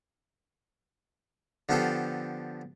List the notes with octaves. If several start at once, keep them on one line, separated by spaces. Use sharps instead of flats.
D3 F3 B3 F4 G4 A4